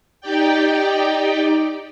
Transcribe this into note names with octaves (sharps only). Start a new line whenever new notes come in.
D#4 G4 D5 G5